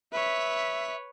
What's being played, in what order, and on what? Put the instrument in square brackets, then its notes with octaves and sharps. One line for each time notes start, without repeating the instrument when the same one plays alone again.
[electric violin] B4 C#5 [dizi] E5